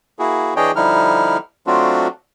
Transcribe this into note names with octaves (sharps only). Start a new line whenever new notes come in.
A#3 E4 F#4 G#4
E3 D4 G#4 C#5 D#5 G5
D3 F3 G3 D#4 E4 F6
F#3 A3 C4 D4 F4 F#4